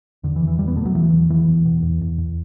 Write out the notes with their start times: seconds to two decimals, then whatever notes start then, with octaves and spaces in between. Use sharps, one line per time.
0.23 E2 D3
0.36 E3
0.42 E2
0.48 E3
0.59 E2 G3
0.68 B3
0.77 B2 A3
0.86 F#3
0.94 E2 E3
1.13 E2
1.29 E2 E3
1.47 E2
1.65 B2
1.82 E2
2.01 E2
2.18 E2